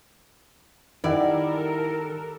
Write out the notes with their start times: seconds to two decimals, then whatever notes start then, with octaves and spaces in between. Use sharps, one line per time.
1.04 D#3 G3 E4 A4 A#4 D5 F#5